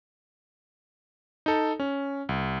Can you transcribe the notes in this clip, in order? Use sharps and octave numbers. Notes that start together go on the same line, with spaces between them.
D#4 A4
C#4
C2